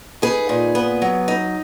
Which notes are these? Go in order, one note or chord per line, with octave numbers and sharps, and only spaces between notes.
D#4 G#4 B4
A#2
B3
F#3
D#4